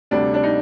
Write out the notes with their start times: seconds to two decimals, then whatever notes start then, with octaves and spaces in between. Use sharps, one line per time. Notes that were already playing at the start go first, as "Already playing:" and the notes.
0.11 D2 C3 G3 D4
0.34 D4
0.43 D#4